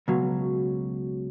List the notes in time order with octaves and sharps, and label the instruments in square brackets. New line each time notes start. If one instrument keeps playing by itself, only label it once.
[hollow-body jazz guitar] C#2 B2 F#3